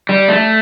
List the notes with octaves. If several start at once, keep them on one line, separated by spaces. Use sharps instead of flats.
G3
A3